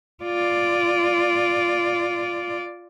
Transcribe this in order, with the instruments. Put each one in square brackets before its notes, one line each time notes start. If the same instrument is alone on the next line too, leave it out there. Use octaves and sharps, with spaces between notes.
[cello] F4 D5